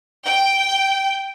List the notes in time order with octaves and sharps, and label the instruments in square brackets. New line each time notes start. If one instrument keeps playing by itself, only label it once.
[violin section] G5